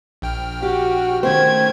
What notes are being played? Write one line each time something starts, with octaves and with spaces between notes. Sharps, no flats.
A#1 G5 F6
F#4 G4
D#3 A3 C#4 C5 G5 G#6